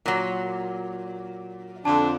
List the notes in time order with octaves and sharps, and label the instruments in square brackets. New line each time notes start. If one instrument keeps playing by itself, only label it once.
[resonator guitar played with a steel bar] A#2 F#3
[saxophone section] F2 D3 [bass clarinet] D4 [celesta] A5